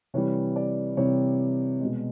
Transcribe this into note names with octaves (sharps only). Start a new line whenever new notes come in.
C3 E3 G3 C#5
D5
C3 E3 G3 C#5
B2 G#3